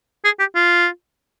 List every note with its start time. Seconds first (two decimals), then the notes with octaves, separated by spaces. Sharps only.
0.25 G#4
0.39 G4
0.55 F4